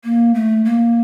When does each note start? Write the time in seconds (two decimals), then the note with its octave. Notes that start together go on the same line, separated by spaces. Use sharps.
0.04 A#3
0.34 A3
0.65 A#3